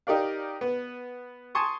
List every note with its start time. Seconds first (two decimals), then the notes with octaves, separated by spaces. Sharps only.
0.07 D#4 G4 A#4 D5 F5
0.61 B3 B4
1.55 G#5 A5 C6 C#6 D#6